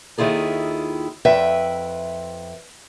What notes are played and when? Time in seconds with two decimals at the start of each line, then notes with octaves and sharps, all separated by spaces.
0.18 D#2 D#3 E4 F4 G#4 A4
1.25 F2 B4 E5 G5